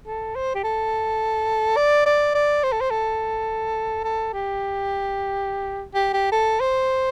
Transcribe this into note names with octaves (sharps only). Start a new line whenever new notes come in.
A4
C5
G4
A4
D5
D5
D5
C5
A4
C5
A4
A4
G4
G4
G4
A4
C5